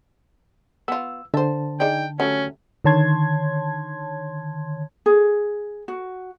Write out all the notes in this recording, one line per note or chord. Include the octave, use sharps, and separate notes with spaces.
B3 F4 E6
D3 C5 E5 A5
D#4 G#4 D5 G5
F#3 G3 A3 C#4
D3 D#3 C#5 A5 C6 G#6
G#4
F#4